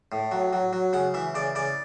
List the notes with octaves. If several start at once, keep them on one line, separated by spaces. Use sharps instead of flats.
A2
F#3
F#3
F#3
C#3 F#5
E3 E5
C#3 D5
C#3 D5